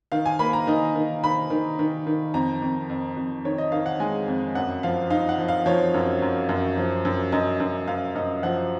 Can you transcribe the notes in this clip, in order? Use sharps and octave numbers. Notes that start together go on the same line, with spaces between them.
D#3 F5
G#5
A#3 B5
A#5
D#3 D#5
D#3
D#3 B5
D#3
D#3
D#3
F2 A#5
F2
F2
F2
D#3 C#5
D#5
D#3 F5
F#5
G#3 G#5
F2
F#2 F#5
F3 F5
D#4 F5
F#5
F3
F5
F3 C#5
F#2
F#2
F#2
F3
F#2
F#2 D#5
F#2
F#2 F5
F#2 D#5
F3 F#5